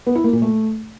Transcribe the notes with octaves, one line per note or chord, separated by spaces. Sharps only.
B3
E4
A#3
A#2
A3